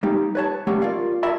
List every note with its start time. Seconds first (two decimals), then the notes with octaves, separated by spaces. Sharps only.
0.03 G3 A#3 D#4 G4
0.35 B4 C#5 A5
0.67 G3 A3 A#3 C#4 G4 F#5
0.82 F4 A#4 D5 F5
1.23 F4 A#4 D5 E5 A5 B5